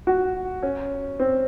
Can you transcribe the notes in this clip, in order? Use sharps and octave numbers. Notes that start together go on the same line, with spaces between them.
F#4
C#4
C4